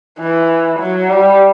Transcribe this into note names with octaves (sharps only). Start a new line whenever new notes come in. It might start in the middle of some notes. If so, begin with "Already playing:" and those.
E3
F#3
G3